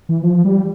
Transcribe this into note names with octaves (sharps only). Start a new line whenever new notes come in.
E3
F3
G3